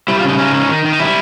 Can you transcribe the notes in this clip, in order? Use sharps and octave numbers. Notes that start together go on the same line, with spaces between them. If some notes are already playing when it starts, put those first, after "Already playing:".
G3 E4
F4
C#3 D#4
C#4 D#4
C#4
D#3
D#3
D#4
G3 E4